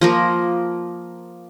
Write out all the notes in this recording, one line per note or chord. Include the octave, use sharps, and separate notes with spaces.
F3 A#3 A#4